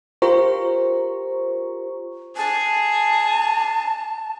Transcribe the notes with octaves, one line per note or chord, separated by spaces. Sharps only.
F4 G4 A#4 C5 A#5 C#6
G#4 A5